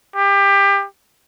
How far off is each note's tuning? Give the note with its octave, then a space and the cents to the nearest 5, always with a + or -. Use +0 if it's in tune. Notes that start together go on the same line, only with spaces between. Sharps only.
G4 +25